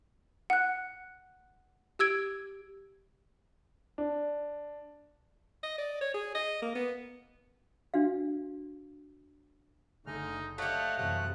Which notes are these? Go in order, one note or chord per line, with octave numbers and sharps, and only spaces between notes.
F#5 F#6
G4 E6 G#6 D7
D4
D#5
D5
C#5
G#4
D#5
A#3
B3
D4 F#4 F5
F#1 D3 A3 D#4 G#4 F6
A3 G4 C#5 D#5 F5 F#5
F#2 C3 E3 F#5